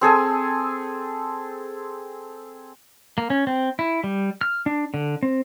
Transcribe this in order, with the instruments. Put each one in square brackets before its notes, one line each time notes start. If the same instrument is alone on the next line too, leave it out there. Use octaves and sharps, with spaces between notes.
[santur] C4 G#4 A4 G#5
[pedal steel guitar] A#3
C#4
C4
E4
G3
F6
D4
D3
C4